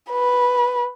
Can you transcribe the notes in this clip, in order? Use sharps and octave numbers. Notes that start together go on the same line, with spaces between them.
B4